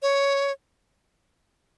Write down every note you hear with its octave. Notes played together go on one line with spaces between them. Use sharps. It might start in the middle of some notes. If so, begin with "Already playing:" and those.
C#5